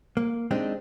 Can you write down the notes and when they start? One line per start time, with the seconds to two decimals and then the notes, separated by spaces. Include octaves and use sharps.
0.17 A#3
0.51 G#3 C4 D4 D#4 G4